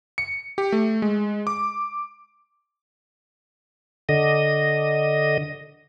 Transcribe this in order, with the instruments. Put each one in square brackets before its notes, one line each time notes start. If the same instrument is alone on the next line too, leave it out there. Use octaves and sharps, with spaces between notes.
[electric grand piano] C#7
G4
A3
G#3
D6
[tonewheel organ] D3 D#5